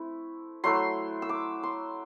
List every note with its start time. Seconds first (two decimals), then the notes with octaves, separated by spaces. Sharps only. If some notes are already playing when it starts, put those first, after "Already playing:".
Already playing: A3 C4 E4
0.64 F#3 A3 E4 C6
1.22 E6
1.29 D6
1.63 C6